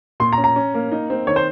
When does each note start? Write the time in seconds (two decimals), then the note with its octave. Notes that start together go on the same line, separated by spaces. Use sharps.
0.20 A#2 C6
0.33 A#5
0.38 C#4
0.44 A#5
0.56 C#4
0.74 A#3
0.92 D#4
1.10 C4
1.27 D#3 C#5
1.36 C5